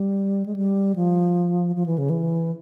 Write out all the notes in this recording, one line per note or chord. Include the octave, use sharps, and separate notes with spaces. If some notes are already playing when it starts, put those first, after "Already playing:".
Already playing: G3
G#3
G3
F3
F3
E3
C#3
E3